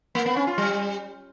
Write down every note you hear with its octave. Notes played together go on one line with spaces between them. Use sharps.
A#3
B3
C#4
F4
G3